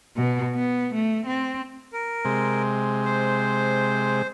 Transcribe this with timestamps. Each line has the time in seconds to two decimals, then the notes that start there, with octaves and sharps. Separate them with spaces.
0.17 B2
0.54 B3
0.94 A3
1.26 C4
1.93 A#4
2.25 C3 G#3
3.05 C5